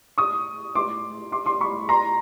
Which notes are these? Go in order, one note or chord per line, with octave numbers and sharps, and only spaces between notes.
C#6 D#6
C6 D6
C6 D6
C6 D6
B5 C#6
A#5 C6